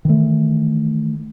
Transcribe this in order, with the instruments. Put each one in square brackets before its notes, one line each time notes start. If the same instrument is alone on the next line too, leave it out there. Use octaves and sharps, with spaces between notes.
[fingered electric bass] D#3 E3 A3